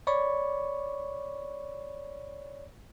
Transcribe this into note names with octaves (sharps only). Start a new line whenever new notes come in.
C#5 D5 B5 C#6